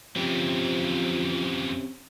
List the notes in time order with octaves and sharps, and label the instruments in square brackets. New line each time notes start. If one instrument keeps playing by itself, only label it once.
[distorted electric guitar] F2 E3 [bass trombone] F3 [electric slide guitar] C4 C#4 G4